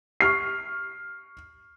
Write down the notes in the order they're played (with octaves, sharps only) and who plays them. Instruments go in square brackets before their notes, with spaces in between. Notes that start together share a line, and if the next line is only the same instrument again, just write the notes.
[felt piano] C#6 F6 C7